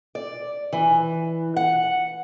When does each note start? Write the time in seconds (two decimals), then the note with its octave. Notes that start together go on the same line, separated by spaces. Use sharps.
0.15 D5
0.73 E3
1.56 F#5